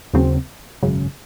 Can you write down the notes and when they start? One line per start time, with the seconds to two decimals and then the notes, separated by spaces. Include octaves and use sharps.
0.14 D#2 C#3 F#3 C4
0.83 G#1 F#2 C#3